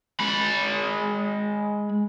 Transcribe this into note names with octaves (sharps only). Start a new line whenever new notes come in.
G#3 B5